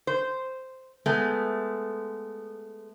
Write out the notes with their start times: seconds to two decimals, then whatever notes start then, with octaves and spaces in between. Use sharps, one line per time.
0.07 C5
1.06 G#3 A3 B3